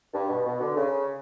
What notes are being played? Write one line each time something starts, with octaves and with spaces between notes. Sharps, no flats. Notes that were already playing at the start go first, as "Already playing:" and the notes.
G2
B2
B2
D3
C#3